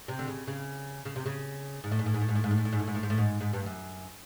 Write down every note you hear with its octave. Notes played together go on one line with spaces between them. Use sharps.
C3
D3
C#3
C#3
C#3
C3
C#3
G#2
A2
G#2
A2
G#2
A2
G#2
A2
G#2
A2
G#2
A2
G#2
A2
G#2
A2
G#2
A2
G#2
G#2
G2
F#2